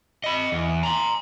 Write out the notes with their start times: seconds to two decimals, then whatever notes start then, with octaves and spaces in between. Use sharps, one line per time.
0.24 D#5 B5
0.52 E2
0.83 A#5 C6